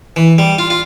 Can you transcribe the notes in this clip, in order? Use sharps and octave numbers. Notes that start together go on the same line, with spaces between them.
E3
G3
F4
F4